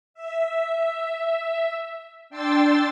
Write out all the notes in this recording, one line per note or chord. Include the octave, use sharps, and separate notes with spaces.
E5
D4 G5 C6 E6 A6